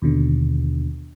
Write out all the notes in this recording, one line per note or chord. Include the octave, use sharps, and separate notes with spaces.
D#2 B2 D3